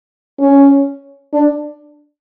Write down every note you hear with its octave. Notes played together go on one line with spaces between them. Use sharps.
C#4
D4